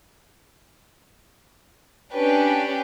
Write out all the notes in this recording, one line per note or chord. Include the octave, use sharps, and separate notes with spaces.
C#4 D4 G4 B4 G5